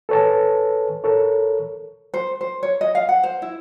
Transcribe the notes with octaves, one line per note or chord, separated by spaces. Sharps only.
A4 B4 C#5 G#5 A5
A4 A#4 C#5
C5
C5
C#5
D#5
F5
F#5
C5
E4